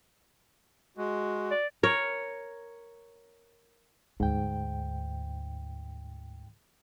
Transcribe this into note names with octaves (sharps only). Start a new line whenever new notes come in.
G#3 F#4
D5
A#4 C#5
D2 G#2 G5